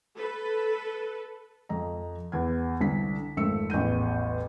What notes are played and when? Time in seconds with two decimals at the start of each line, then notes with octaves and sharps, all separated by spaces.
0.17 A4 B4
1.69 F2 D#5 A#5
2.32 E2 G#6
2.80 C2 D3 B6
3.37 G#1 F2 A3 E6 C#7
3.70 A1 E2 G6 D#7